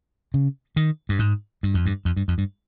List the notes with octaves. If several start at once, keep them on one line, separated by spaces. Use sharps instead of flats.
C#3
D#3
G2
G#2
G2
F2
G2
F2
G2
F2
G2